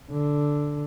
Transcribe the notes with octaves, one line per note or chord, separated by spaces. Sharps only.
D3